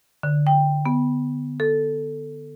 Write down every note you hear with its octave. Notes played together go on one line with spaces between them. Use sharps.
D3
G5
B3
A4